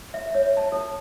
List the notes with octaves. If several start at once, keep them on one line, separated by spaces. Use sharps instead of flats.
E5
C#5
A5
A4